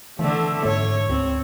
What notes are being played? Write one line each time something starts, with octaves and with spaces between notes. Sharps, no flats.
D3 E3 A3
G#2 C#5
D2 C4